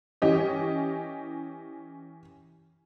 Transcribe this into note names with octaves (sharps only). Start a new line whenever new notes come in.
E3 C#4 G4 D#5